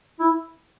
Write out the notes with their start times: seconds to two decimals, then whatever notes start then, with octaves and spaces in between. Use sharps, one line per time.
0.20 E4